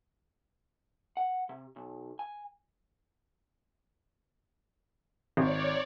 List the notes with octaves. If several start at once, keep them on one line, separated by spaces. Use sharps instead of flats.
F#5
C3
B1
G#5
G#1 C#5 D5